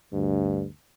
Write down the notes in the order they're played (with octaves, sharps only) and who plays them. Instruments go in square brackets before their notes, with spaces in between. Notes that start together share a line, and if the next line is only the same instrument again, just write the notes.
[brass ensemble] D2 [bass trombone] G2